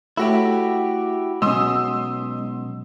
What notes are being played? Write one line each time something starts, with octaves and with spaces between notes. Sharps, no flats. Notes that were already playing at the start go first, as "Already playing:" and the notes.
A3 E4 F#4 G4 C#5
B1 B2 G#3 C#4 C6 D#6 E6